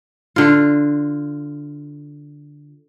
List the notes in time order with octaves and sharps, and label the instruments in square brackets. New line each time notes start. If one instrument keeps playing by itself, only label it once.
[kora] D3 F4